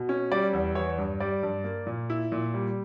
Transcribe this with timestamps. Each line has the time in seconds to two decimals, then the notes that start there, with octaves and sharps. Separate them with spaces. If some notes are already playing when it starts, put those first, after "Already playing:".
Already playing: B2
0.09 C#4
0.31 G3 D5
0.53 E2
0.75 E3 C#5
0.98 G2
1.20 G3 D5
1.43 G2
1.64 A#3
1.87 A#2
2.10 E4
2.32 A#2
2.54 G3